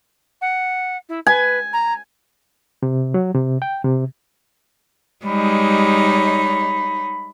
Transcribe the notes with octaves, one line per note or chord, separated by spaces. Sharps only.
F#5
E4
B4 G#5
A#5
C3
F#3
C3
G5
C3
G3 G#3 D#4 C#5 B5